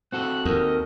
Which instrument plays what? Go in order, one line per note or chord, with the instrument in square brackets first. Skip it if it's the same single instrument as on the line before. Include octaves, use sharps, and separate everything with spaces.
[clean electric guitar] C4 F#4 A4 [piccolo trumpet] F#6
[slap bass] D#2 [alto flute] A#4 [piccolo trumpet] D#5